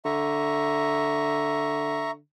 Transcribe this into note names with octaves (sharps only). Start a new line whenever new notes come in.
D3 E5 A#5 C#6